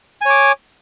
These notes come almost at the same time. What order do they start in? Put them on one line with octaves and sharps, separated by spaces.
G#5 C#5 D6